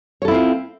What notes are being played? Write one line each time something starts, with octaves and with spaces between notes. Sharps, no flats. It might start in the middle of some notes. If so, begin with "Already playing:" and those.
C4 E4 F4 A4 C#5